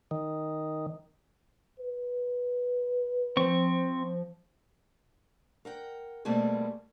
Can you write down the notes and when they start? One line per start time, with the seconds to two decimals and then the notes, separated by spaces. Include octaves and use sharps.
0.11 D#3
1.79 B4
3.37 F3 C4 C#6
5.65 A#4 F#5 G5
6.25 B2 G3 A3 A#3 C4 G#4